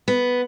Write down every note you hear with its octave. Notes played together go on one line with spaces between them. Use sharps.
B3